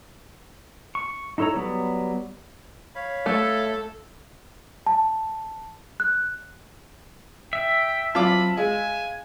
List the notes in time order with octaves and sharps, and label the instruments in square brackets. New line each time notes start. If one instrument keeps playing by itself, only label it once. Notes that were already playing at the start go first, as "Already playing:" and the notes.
[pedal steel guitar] C#6
D#4 E4 A4 C#5 A#5
F#3 G3 B3
[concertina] C#5 F5 B5
[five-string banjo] A3 [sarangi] A4
[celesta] A5
F#6
[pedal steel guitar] E5 [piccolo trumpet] G5
[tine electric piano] F#3 C4 A5 [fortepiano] F4 D6 [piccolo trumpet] B5
[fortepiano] G#3 [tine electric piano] F5 [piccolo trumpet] G#5